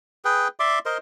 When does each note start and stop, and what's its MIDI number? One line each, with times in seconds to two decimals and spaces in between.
0.25 0.48 68
0.25 0.48 71
0.25 0.48 79
0.60 0.79 74
0.60 0.79 76
0.60 0.79 84
0.60 0.79 86
0.86 0.98 70
0.86 0.98 72
0.86 0.98 75
0.86 0.98 84